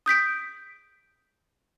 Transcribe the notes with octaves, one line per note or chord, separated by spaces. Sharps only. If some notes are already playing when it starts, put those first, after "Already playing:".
D#6 G6 B6 D7